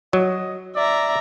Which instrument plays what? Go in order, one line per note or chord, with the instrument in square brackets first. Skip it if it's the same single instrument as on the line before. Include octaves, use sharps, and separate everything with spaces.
[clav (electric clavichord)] F#3 [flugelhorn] D#5
[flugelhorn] D5 [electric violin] E5 A#5